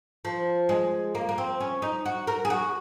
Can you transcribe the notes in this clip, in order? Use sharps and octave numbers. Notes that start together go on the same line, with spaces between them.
F3
G#3
A#3
A#3
C4
C#4
D#4
F#4
A#4
G#4
F#4